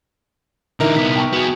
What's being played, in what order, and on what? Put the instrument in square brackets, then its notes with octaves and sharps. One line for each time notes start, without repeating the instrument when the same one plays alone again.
[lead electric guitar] D3 E3 [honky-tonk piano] D#4 E4 A#4
[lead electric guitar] C2 B3 [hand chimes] B6
[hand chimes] G5 A5 C#6
[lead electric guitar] B3 G#4 [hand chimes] F#4